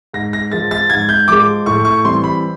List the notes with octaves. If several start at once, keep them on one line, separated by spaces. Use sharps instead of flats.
G#2 A#6
A#6
F3 G#3 A6
A6
G#2 G#6
G6
F3 G#3 D6
A2 C#6
C#6
E3 G3 C4 C6
B5